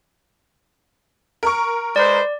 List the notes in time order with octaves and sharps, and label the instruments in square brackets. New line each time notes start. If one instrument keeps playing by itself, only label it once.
[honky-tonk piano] A#4 C#6
[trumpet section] G#3 B4 C5 [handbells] D5